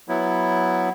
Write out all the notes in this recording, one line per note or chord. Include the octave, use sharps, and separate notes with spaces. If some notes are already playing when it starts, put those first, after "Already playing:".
F#3 B3 E4